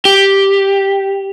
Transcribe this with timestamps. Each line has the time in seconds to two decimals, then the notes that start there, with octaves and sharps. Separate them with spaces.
0.05 G4